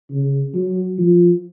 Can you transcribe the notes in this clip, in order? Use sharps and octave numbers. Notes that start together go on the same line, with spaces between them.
C#3
F#3
F3